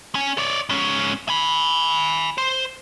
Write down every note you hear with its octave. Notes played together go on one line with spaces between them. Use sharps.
C#4
C#5 D5
G#2 C#4
G#5 B5
C5